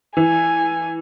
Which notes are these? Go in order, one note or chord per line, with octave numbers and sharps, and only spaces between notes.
E3 G#5